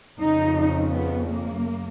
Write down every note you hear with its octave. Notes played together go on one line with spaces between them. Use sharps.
F2 C#3 D#4
B3
A#3
F#2